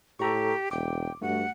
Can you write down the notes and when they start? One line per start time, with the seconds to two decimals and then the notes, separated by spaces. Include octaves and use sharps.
0.19 A2 G4 A4 A#5 C#6
0.71 E1 G5 D6
1.22 G2 A3 F#4 F#5